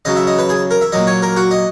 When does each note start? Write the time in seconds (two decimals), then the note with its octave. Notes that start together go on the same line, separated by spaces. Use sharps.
0.05 C#3 F#3 D#5
0.17 E5
0.27 D#5
0.39 B4
0.49 G#4
0.71 A#4
0.81 E5
0.92 A#2 F#3 D#5
1.07 C#5
1.22 A#4
1.37 F#4
1.51 D#5